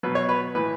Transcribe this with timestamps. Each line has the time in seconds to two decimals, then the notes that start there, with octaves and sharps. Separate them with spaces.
0.03 B2 F#3 B4
0.15 C#5
0.29 B4
0.55 A2 E3 B4